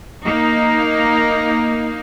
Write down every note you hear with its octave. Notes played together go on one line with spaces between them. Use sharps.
A#3 D#4